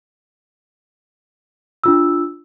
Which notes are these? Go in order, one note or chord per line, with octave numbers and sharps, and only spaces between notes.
D4 F4 E6